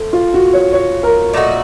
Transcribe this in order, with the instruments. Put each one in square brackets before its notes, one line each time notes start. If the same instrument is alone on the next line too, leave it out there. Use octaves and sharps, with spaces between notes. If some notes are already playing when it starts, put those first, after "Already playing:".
Already playing: [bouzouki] A3 C5
[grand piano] F4
F#4
C#5
C#5
A#4
[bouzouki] A#2 A3 D#4 F#4